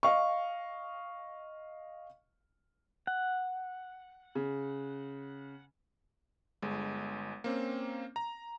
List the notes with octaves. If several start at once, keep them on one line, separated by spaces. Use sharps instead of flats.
D#5 F5 C#6
F#5
C#3
G1 G#3
A#3 C4 C#4
A#5